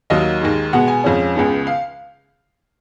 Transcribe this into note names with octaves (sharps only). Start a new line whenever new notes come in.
D#2 D#3 F#3 A#3 D#5
D#2 D#3 G#3
B2 G#3 B3 F#5
G#5
F2 F3 G#3 C#4
C#2 C#3 G#3 B3
F5